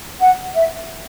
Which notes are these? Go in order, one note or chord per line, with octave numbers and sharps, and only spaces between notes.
F#5
E5